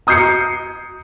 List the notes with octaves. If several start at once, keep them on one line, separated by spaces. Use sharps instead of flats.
A#5 D#6 G6 G#6 C7 C#7